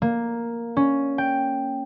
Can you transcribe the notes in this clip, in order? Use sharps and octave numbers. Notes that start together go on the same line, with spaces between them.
A#3
C#4
G5